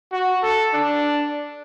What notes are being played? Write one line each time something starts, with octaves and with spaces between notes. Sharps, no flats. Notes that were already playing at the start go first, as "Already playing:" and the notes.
F#4
A4
D4